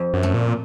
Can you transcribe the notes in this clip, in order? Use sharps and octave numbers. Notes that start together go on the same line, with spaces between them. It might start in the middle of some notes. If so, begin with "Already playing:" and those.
Already playing: F2
F#2
A3
A#2